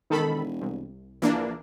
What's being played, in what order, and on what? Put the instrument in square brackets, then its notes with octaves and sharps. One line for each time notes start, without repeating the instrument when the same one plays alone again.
[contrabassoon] E1 [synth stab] D#3 A4 B5
[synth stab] C2
[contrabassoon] A#1 [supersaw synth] E3 A#3 D4